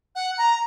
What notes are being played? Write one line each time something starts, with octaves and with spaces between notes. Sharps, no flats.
F#5
A#5